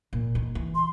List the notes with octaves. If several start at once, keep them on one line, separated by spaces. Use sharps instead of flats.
A#2
D#3
E3
C6